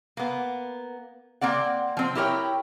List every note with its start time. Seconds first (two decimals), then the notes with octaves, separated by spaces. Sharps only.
0.17 A#3 B3
1.41 A#3 C4 D5 F#5
1.97 F3 C4
2.15 E4 G4 A#4 C#5 G5